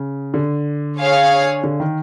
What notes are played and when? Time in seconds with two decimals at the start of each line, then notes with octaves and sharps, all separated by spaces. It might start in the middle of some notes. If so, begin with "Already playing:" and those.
Already playing: C#3
0.34 D3
0.99 G#4 C#5 F5
1.64 D3
1.80 D#3